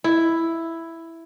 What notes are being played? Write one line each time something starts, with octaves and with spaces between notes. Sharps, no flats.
E4